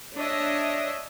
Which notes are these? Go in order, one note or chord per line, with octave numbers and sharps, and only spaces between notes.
D4 C#5 D#5 E5